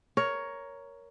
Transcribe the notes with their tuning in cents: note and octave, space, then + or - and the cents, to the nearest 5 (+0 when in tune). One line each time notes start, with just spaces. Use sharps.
A#4 +5 C#5 +10